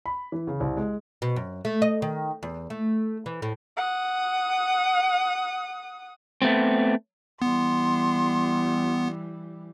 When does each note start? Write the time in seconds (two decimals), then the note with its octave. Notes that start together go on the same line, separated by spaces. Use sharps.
0.06 B5
0.32 E3
0.47 C#3
0.60 C2
0.77 G#3
1.22 B2
1.36 F#2
1.65 A3
1.82 D#5
2.02 D#3
2.43 E2
2.70 A3
3.26 E3
3.42 A2
3.77 F#5 D#6
6.42 A3 B3 C4
7.42 E3 G3 B3 C6